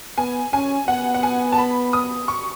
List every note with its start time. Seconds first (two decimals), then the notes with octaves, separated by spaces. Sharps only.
0.18 B3 G#5
0.53 C#4 G#5
0.88 B3 F#5
1.14 F#5
1.23 G#5
1.52 A5
1.58 B5
1.93 D#6
2.28 C#6